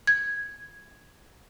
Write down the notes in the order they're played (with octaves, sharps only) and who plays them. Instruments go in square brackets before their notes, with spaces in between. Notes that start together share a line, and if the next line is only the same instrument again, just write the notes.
[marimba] G#6